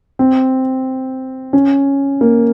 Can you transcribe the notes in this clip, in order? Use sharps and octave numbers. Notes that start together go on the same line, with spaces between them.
C4
C#4
A#3